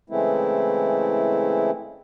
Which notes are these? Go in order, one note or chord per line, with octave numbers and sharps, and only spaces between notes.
C#3 E3 G#3 A3 C4 E4